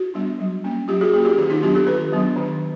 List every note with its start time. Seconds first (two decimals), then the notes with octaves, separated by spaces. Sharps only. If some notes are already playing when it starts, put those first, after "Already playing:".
Already playing: E4 F#4
0.14 G3 B3 D4
0.39 F#3
0.64 A#3 C#4
0.88 F#3 F4 G4
1.01 F#4 G#4
1.13 A#3 F#4 G#4
1.18 C#4
1.25 F4 G4
1.37 D#3 F4 G4
1.50 D#4 F4
1.62 F#3 B3 D4 F4 G4
1.75 G4 A4
1.87 D#3 A4 B4
2.13 F#3 B3 D4
2.37 D#3